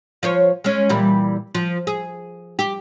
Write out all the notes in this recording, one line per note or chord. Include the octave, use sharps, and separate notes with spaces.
F3 C5 C#5
G#3 C#4
A#2 E3 G3
F3
G#4
G4